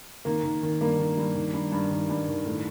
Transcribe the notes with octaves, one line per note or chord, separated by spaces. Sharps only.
D#3 A#3
D#3
D#3
G2 A#3
D#3
G2
D#3
G2
G2
D#3
G2
D#3
A2